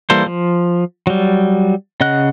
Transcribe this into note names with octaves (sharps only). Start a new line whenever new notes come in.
E3 G3 A#3 A4 C5
F3
F#3 G3
C#3 D#5 F#5 F#6